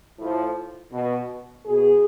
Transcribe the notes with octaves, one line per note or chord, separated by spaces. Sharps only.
A2 F3
B2
B2 G#4